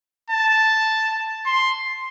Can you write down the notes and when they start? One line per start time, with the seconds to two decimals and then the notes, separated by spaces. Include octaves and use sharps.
0.30 A5
1.46 C6